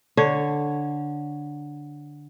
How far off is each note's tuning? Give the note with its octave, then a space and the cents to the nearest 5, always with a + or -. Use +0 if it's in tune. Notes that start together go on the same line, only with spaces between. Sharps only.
D3 +0 C#5 +0